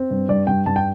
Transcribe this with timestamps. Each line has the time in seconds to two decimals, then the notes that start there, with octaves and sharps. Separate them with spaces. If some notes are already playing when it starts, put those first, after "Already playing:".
Already playing: C4
0.11 G2
0.29 G2 D5
0.47 G2 G5
0.66 G2 A5
0.76 G5